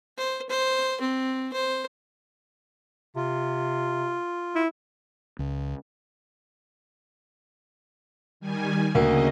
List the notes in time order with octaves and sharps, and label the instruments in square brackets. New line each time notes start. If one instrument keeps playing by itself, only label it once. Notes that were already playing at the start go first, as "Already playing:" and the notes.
[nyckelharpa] C5
C5
C4
C5
[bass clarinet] C3 [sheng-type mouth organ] F4
[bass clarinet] E4
[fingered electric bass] C#2
[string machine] D#3 G3 G#5
[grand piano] D2 A#3 F#4 [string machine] C#3 D#5